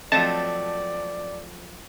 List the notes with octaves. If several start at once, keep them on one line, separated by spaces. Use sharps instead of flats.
F3 F#3 A3 C4 D5 D#5 A5